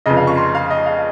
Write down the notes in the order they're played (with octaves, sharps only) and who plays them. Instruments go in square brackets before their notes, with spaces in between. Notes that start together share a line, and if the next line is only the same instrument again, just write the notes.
[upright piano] F1 F2 C#3 D#5
F5
C#6
C6
F5
D#5
F5